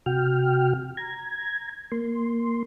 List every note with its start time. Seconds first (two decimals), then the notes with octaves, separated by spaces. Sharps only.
0.06 C3 F#4 G5 F6
0.97 A#5 G#6
1.92 A#3 C6